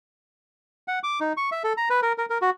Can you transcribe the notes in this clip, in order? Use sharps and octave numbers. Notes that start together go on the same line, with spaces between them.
F#5
D6
D#4
C#6
E5
A4
A#5
B4
A#4
A#4
A#4
F#4